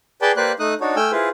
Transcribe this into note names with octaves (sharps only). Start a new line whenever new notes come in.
G#4 B4 D5 G5 A5
A#3 G4 B4 C5 D5 F#6
A3 D#4 D#6 F#6
D4 D#4 F#4 C#5
A3 G5 G#5 E6 F6
E4 F4 G#4 B4 C5